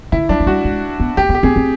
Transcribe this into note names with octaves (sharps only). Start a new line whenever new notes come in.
D3 E4
F#3 D4
F#3
G3 F#4
G#3
B3
A3 G4
B3
G4
C4 G#4
C4